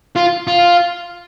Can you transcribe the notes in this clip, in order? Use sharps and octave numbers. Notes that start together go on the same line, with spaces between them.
F4
F4